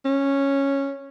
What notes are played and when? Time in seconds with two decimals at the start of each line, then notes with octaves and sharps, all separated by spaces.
0.05 C#4